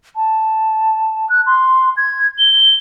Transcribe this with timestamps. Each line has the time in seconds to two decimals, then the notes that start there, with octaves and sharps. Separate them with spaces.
0.16 A5
1.29 F#6
1.47 C6
1.97 G#6
2.39 G7